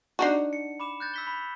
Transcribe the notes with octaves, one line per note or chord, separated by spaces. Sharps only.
D4 D#4 F#4
C#7
B5 D6 E7
F#6 G6 A6
E6 B6 G7
B5